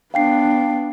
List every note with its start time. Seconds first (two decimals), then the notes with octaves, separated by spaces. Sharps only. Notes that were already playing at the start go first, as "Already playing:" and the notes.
0.14 B3 D4 F5 G5 C7